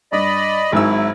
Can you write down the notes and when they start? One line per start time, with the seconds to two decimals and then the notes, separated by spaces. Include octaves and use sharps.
0.12 G2 D5 D#5 B5
0.72 G#1 G#2 F#3 E4 E6